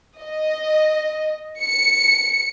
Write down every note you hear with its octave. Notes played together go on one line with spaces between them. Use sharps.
D#5
C#7